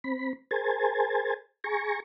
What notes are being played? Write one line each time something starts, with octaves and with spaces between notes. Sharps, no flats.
C4 B5
G#4 A#4 C5 G#5 A5
G#4 G#5 A#5 C#6